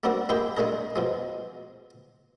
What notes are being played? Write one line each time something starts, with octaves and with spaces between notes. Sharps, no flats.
A3 A#3 C4 D4 F#4 A#4
G#3 A#3 E4 G4 G#4 G5
G#3 A3 D4 G#4 A#4
B2 F3 G#3